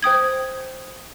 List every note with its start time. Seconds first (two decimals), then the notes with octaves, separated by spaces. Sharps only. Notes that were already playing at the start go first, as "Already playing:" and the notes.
0.03 C5 G5 D#6 G#6